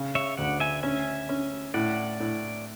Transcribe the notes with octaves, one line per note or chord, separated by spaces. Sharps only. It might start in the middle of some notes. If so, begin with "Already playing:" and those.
Already playing: C#3
C#5 E5
D2 D5 F#5
E5 G#5
C#4 E5 G#5
C#4
A2 D5 F#5
A2